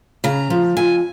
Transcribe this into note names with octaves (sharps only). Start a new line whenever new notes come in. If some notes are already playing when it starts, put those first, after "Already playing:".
C#3 A#5
F3
F2 G#5